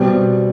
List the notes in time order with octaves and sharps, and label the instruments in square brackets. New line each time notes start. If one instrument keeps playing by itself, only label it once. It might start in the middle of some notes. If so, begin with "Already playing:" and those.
Already playing: [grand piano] B2 G3 C4